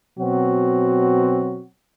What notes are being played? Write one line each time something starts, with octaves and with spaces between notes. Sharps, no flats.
B2 F#3 C4 F#4